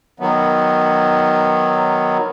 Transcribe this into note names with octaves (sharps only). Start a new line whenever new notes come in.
D#3 F#3 B3